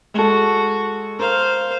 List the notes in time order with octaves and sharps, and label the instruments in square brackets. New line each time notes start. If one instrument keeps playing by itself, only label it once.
[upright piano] G#3 A4 [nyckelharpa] F#4
[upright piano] A#4 [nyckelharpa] C5 F5